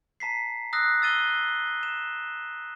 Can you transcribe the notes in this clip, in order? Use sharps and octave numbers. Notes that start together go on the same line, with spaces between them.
A5 A#5 B6 C7
D#6 E6 F#6 A#6 C7
E6 A6 D#7 G7
E7